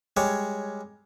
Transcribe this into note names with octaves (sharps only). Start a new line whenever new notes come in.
G3 G#3 C#5